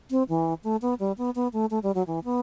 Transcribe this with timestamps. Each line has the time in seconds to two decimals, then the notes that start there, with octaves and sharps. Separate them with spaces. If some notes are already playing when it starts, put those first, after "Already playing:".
0.11 C4
0.29 E3
0.64 A3
0.82 B3
0.99 G3
1.18 B3
1.35 B3
1.53 A3
1.70 A3
1.83 G3
1.95 F#3
2.07 E3
2.24 B3